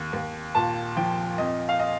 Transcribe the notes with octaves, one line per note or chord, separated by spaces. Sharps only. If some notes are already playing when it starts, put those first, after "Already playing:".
Already playing: D#2
D#2
A#2 A5
F3 G5
F2 D#5
F5
D#5